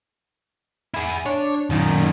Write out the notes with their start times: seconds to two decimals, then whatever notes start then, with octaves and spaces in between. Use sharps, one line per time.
0.94 E4 G#4
1.26 D4 C#5
1.70 F#2 A#2 D#3 D#4